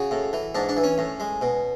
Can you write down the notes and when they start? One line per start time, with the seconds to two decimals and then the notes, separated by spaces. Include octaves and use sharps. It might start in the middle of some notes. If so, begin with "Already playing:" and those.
Already playing: C#3 F#4
0.11 A2
0.33 E3
0.55 G#2 D4
0.69 D4
0.77 E3
0.84 C#4
0.98 A2
1.20 G#3
1.41 B2